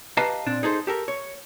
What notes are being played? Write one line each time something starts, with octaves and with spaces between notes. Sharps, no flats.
G4 B4 D#5 F5 A5 A#5
A#2 C4 D4
D#4 G#4 A4 C5
G4 A4 A#4
C#5